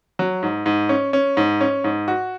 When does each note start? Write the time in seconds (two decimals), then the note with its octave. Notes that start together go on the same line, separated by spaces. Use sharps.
0.19 F#3
0.43 G#2
0.66 G#2
0.89 C#4
1.13 C#4
1.37 G#2
1.61 C#4
1.84 G#2
2.08 F#4